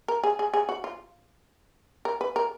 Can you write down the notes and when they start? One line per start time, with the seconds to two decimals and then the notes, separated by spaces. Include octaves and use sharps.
0.08 A#4
0.23 G#4
0.39 G#4
0.54 G#4
0.69 F#4
0.84 F4
2.05 A#4
2.21 B4
2.36 A#4